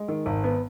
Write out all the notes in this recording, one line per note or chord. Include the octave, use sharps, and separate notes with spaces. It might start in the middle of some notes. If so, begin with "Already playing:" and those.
Already playing: G#3
D#3
G#1
B3